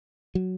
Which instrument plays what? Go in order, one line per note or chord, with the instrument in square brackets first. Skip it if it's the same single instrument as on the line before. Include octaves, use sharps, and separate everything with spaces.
[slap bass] F#3